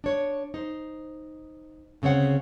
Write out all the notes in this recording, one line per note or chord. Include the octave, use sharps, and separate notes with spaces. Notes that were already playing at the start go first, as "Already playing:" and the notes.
D4 C#5
D#4 C5
D2 C#3 C4 C#5 F#5